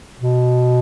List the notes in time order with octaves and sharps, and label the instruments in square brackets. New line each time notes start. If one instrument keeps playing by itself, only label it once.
[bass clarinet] B2